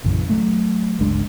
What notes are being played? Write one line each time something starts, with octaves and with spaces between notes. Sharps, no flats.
A#1 F#2 C#3 E3
F#3 A3
G1 C#2 G#3 D4